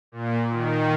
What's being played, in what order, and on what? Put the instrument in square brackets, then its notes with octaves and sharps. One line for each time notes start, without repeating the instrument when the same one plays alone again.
[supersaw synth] A#2
D#3